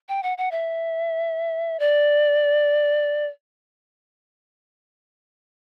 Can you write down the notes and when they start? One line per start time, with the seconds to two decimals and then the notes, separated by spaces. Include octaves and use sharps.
0.09 G5
0.23 F#5
0.38 F#5
0.51 E5
1.79 D5